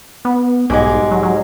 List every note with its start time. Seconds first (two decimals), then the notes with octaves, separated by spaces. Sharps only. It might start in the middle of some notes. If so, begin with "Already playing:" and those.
0.25 B3
0.70 B1 G#2 G3 G#3
1.11 F#3
1.23 F#3